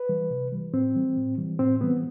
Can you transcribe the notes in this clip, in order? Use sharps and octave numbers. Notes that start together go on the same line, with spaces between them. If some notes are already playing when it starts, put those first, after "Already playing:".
Already playing: B4
E3 G3
C3
E3 G3
A2 C4
E3 G3
A2
E3 G3
A2 C4
E3 G3 B3